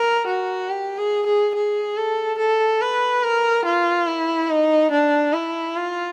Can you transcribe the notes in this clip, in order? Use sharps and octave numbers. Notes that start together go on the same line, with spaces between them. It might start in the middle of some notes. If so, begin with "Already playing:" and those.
Already playing: A#4
F#4
G4
G#4
G#4
G#4
A4
A4
B4
A#4
F4
E4
D#4
D4
E4
F4